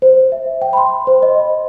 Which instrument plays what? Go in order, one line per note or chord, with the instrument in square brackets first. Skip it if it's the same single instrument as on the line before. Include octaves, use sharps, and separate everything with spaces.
[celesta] C5
E5
G5
B5
C6
C5
D#5